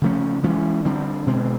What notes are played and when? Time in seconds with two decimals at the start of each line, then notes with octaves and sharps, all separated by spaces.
0.02 C#3 F3 A3 C#4
0.43 E3 G#3 C#4
0.85 D3 G3 C4
1.27 B2 G#3 C4